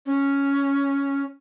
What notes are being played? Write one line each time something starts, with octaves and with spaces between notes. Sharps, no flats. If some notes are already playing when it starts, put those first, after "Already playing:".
C#4